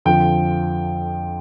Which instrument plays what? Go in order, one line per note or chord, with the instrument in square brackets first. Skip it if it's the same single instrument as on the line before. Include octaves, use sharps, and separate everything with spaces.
[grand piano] F2 D3 F3 G5